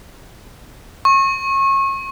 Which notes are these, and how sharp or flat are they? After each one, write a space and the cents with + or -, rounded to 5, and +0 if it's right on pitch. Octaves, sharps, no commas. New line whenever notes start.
C#6 -30